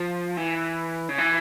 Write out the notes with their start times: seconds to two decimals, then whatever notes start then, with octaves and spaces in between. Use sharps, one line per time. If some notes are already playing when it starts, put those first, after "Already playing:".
Already playing: F3
0.37 E3
1.09 C#3
1.18 E3